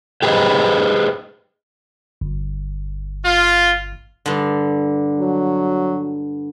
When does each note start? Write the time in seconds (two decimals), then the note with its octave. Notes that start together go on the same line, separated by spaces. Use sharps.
0.22 G4 G#4 B4 C5 D#5
2.21 G1
3.25 F4
4.26 G2 D3
5.20 F#3